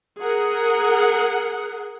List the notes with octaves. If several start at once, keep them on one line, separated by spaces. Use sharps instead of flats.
G#4 A#4 F#5